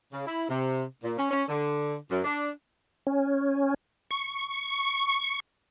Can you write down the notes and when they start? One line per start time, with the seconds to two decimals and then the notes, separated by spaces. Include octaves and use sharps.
0.12 C#3
0.26 E4
0.49 C3
1.03 A#2
1.18 C#4
1.31 C#4
1.48 D3
2.10 F#2
2.24 D4
3.07 C#4
4.11 C#6